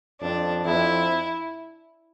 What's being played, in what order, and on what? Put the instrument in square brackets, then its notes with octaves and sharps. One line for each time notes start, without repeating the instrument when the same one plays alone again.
[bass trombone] F2 [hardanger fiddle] D4
[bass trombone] F2 [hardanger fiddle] E4